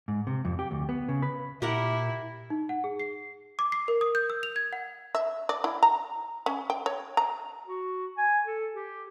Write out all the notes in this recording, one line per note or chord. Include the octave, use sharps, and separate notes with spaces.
G#2
C3
F2
G4
D2
B3
C#3
B4
A#2 E4 G4 A#4 F#5
D#4
F#5
G#4
C7
D6
C7
A#4
D#6
G6
E6
F7
G#6
F#5
E5
D5
E4
A#5
C#4
G5
C#5
A#5
F#4
G#5
A4
G4